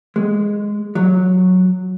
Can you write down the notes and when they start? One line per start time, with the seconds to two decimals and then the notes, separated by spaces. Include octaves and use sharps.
0.16 G#3
0.95 F#3